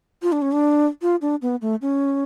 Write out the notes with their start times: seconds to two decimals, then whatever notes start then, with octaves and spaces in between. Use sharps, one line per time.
0.23 F4
0.32 D4
0.42 C#4
0.52 D4
1.02 F4
1.22 D4
1.42 B3
1.62 A3
1.82 C#4